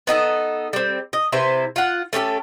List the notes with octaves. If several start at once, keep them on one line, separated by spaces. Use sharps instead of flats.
B3 D#4 G4 A4
G3 C4
D#5
C3 E4 B4 C5
F4 F#5
A3 C#4 G4 A4